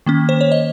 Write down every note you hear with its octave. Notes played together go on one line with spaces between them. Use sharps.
D#3 A#3 C#4
C5
C#5
D#5